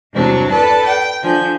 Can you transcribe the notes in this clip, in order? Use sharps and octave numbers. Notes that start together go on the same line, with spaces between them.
E2 G2 C3 F#3 C4 D4
A4 B4 D5 A5
G5
D3 F3 G#5 G6